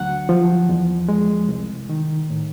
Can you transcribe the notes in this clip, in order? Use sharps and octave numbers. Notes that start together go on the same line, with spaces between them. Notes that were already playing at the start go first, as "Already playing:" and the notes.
Already playing: D2 F#3 F#5
F3
E2
G#3
C2
D#3
A2